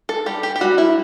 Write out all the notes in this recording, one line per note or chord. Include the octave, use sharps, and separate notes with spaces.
A4
G3 G4
G4
G4
G3 F#4
E4